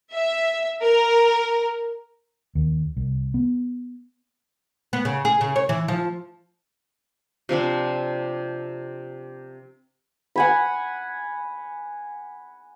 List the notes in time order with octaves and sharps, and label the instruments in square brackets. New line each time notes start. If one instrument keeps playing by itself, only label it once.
[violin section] E5
A#4
[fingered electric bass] D#2
C2
B3
[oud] B3
C#3
G#4
C#3
C#5
E3
F3
[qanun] C3 F3 C4 D4
[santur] F#5 G#5 B5